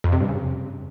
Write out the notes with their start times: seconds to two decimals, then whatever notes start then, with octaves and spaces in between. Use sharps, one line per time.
0.04 F2
0.12 C3
0.20 G2
0.29 C#3